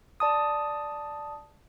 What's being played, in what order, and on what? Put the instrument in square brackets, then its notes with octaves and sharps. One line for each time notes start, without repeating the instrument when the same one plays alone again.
[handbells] D5 A5 D#6